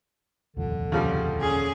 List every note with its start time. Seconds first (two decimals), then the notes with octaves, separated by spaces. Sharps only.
0.57 D#1 C2 F2 D3
0.92 C#3 F3 G3
1.40 C#4 G#4